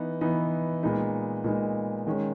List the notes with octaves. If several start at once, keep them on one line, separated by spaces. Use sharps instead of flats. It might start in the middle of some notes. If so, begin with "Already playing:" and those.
Already playing: E3 B3 D#4
E3 B3 D#4
A#2 G#3 B3 D#4
A#2 G#3 B3 D#4
D#3 G#3 C#4